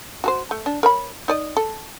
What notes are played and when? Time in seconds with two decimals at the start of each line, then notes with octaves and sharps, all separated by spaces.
0.24 F#4 A4 C5
0.51 A3
0.66 D4
0.83 A#4 C#5 B5
1.28 D#4 D5 D#5
1.57 A4